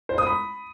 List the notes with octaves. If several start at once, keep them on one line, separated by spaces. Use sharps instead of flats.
C5
D#6
B5